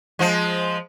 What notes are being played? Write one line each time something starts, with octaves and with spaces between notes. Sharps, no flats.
F3 G#3